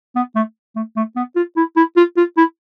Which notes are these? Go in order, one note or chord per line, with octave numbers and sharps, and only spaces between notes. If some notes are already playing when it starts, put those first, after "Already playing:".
B3
A3
A3
A3
B3
F4
E4
E4
F4
F4
E4